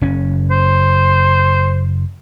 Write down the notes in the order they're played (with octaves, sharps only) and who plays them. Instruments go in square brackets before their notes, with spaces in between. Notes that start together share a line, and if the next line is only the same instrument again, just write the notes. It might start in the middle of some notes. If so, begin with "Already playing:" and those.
[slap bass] F#1 C#4
[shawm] C5